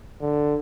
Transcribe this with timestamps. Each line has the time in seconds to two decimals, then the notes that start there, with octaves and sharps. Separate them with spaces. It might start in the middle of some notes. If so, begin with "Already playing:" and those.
0.21 D3